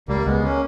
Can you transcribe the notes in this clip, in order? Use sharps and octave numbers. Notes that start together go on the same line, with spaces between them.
C#2 G3 A#3
C#2 G#3 B3
A#3 C#4